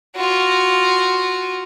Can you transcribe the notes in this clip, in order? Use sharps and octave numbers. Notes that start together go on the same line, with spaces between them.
F4 F#4